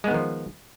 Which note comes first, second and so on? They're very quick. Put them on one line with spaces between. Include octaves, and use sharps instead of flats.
G#3 B3 D#3 F3